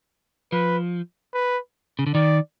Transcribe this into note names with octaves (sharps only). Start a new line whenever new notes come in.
F3 B4
B4
C#3
D3
D#3 D5